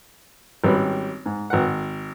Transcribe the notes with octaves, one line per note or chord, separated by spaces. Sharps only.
G#1 G3 C#4 B4 B5
G#2
G#1 F#5